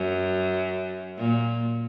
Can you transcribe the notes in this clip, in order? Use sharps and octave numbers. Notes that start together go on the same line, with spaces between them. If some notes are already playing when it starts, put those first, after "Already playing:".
Already playing: F#2
A#2